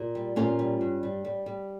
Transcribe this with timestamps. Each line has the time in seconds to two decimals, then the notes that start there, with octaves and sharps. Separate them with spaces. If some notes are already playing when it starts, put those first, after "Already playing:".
Already playing: A#2
0.15 G3
0.36 A#2 C#4 F4
0.59 G3
0.81 G2
1.03 G3
1.25 G3
1.46 G3